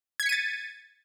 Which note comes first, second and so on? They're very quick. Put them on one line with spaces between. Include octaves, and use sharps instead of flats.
G#6 B6 C#7 D#7 A6